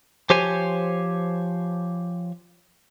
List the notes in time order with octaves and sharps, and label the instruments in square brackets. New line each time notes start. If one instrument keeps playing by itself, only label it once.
[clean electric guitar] F3 G4 C5 C#5 G#5